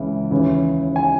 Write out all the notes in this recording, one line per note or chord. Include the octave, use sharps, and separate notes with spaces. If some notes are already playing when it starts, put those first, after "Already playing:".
Already playing: C#2 C#3 E3
D#2 C#3 E3
G#5